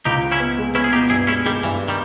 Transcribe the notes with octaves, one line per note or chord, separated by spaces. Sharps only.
C#2 D#4 G4
C#2
C#4 E4
B3
G#3
B3 C#4 E4
G#4
B2 D#4 G4
G2 E4 G#4
G#3 C#4 E4
D#3 G3 G#3
G2 E3
D#3 G3